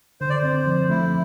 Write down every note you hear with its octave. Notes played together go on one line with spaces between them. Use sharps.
D3 C5
D5
C4 C5
F3
A3 E4